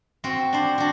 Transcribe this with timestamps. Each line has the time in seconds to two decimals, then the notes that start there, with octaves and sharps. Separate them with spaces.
0.24 C4 F#4
0.53 D4 C5
0.78 D4 F#4